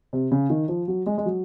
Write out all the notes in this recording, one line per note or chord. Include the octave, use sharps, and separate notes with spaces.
C3
C#3
D#3
F3
F#3
G#3
G#3
F#3